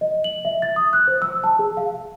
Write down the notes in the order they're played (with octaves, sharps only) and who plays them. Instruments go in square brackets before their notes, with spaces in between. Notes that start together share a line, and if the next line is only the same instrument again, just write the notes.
[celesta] D#5
F#7
E5
A6
D#6
F#6
C5
E6
A5
G#4
F5